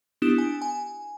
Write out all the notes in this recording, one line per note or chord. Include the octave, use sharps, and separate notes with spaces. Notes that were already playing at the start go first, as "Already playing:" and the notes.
B3 D4 E4 G4 D#6 E7
G#5
G#5